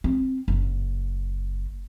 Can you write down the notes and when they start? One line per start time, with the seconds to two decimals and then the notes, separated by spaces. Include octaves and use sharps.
0.04 C4
0.48 F#1